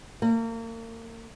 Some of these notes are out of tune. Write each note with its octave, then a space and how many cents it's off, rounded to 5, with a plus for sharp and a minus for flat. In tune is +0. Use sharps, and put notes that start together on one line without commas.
A#3 -35